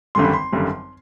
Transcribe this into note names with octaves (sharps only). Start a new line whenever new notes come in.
G#1 F#2 D3 G3 C6
B5
C6
G#1 F#2 D3 G3